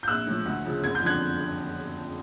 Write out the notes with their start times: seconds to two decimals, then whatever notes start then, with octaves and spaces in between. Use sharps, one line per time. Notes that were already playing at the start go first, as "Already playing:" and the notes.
0.03 G6
0.08 A#1 E6 F#6
0.27 A2 F3
0.46 D2
0.65 C#3 F3
0.83 F#1 G#6
0.95 G6
1.02 F2 D3 F3 F#6 G#6